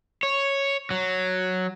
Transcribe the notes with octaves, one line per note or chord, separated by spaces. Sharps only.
C#5
F#3